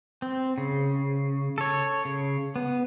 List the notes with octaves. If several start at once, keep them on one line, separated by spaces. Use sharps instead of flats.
C4
C#3
A4 C#5
C#3
B3